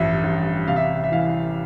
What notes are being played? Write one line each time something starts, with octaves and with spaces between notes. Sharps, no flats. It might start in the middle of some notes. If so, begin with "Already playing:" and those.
Already playing: A1 G2 F3 E5
A1
C3 F5
E5
F5
E5
E3 F5